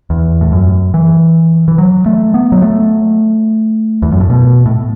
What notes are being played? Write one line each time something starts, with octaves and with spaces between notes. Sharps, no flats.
E2
A2
F#2
E3
E3
F#3
A3
B3
F#3
A3
E2
F#2
A2
B2
A2